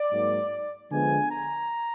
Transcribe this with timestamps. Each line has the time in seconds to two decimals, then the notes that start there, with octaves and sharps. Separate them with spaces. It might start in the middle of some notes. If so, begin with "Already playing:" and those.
Already playing: D5
0.12 G#2 F#3 A#3
0.91 D3 F3 G#3 B3 G#5
1.30 A#5